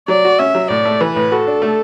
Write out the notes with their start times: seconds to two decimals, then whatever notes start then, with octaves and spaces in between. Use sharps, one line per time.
0.08 F#3 D5
0.25 F#4
0.39 C#4 E5
0.55 F#3
0.70 A2 D5
0.85 A3
1.01 E3 B4
1.16 A2
1.32 F#4 A4
1.47 D4
1.62 A3